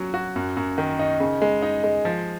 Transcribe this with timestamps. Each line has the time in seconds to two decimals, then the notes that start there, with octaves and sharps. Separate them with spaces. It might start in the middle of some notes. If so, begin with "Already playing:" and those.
Already playing: F#3 C#4 F#4
0.14 F#4
0.36 F#2
0.57 F#2
0.78 D#3
0.99 D#4
1.20 C#3
1.41 G#3
1.62 D#4
1.84 G#3
2.05 F3